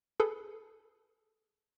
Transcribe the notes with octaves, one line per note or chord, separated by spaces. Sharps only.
G#4 A4 B4